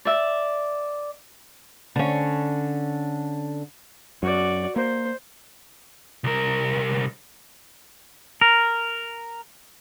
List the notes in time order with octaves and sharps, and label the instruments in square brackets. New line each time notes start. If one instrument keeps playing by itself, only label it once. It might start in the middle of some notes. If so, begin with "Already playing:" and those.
[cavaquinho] D5 E5
[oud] D3 C#4
[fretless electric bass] F#2 [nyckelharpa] F#4 D5
[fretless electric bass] A#3 [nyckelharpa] C5
[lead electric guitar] C2 A#4
[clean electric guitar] A#4